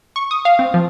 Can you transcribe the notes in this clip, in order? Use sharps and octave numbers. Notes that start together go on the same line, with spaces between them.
C#6
D#6
F5
C4
F3